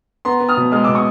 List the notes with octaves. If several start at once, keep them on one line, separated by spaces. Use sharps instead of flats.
B3 A#5 C6
B3
D#6 F6
B2
G#3 D#6 F6
B2 D6 E6
C#6 D#6